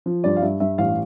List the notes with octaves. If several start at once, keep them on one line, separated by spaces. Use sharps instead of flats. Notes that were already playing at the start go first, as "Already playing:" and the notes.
F3
G2 D5
F5
G2 E5
G2 E5
A1 F5